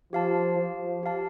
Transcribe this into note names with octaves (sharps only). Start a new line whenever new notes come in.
F3 G4 F5 A5
F3
G4 F5 A5